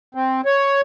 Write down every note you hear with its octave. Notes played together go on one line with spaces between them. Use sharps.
C4
C#5